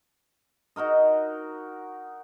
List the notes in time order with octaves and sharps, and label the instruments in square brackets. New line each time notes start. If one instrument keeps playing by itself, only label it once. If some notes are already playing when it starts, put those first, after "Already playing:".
[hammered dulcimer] D#4 F#4 A#4 D#5